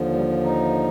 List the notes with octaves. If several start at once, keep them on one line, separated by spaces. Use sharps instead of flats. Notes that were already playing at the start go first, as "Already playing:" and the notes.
Already playing: D#2 D3 F3
G3
D#4